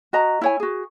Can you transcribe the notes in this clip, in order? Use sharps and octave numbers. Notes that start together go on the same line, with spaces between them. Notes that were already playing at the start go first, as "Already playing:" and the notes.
F#4 D#5 A#5
E4 C#5 G#5
F#4 G#4